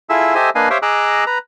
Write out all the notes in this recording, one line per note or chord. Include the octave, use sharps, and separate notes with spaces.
E4 F4 G#4 A4 E5 E6
G4 A4 C5 D#5 E5 G#5
A#3 D4 B4 D#5 F5 G#5
G4 C5 C#5 E5 F5 G5
G#4 D#5 A#5 D6 E6 F#6
B4 A#5